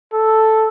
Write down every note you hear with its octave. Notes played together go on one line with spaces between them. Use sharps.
A4